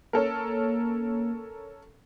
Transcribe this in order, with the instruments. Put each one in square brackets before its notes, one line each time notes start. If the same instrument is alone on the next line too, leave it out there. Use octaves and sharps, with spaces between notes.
[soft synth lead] A#3 [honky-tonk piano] C#4 A4 A#4